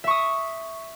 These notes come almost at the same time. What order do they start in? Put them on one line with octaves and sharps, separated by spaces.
E5 C#6 D#6